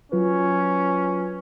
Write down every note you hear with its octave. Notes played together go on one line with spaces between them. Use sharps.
F#3 C#4 F4 B4